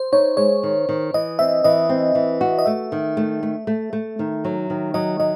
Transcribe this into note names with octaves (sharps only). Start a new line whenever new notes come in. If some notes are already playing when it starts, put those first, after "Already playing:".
Already playing: C5
D#4 C#5
G#3 C#5
D#3
D#3
E3 D#5
C4 E5
E3 D#5
C4
E3
F#4
D#5
A3 E5
D#3
A3
A3
A3
A3
D#3
F#3
D#3
F#3 D#5
F#3 D#5